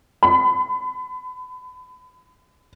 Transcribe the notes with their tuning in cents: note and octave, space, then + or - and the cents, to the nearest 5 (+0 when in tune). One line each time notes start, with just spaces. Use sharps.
B5 +35